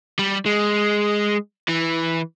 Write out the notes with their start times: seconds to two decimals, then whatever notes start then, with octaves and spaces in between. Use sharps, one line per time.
0.19 G3
0.46 G#3
1.69 E3